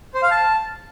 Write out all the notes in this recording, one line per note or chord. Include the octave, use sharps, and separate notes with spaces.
C5
F5
A5